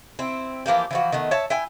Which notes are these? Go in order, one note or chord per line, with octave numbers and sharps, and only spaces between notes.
C4 E4
E3 F3 A#3 G4
E3 F3 F#4
D#3 A3 B3
C#5 E5 A5
E4 G5 G#5